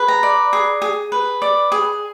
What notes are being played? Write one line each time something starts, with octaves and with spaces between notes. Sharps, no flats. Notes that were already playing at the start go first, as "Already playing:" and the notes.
Already playing: G#4 B4
A#5
D5
G#4
G#4
B4
D5
G#4